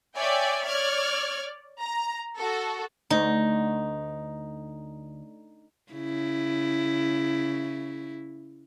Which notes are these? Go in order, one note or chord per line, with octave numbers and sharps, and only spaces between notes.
C#5 D5 E5 G5 G#5
C#5 D5 F6 G#6
A#5
F#4 A4
D2 D#4
C#3 E4